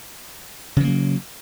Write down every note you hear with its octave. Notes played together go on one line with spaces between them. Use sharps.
C#3 E3 F#3 A#3